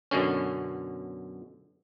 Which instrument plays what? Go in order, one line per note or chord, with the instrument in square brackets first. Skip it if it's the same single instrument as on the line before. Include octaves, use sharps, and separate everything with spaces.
[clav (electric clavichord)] F#2 B2 D3 C#4